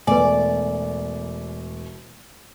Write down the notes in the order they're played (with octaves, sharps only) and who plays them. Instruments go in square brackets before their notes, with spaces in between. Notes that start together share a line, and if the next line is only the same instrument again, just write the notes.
[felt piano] E1 A3 [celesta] B4 G#5 [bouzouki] D5